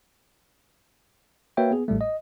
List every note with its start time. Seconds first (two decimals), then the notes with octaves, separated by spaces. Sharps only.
1.57 A#3 F#4 B4 C#5 E5 G5
1.71 B3 G#4
1.88 A1 A2 G3 A3
2.01 D#5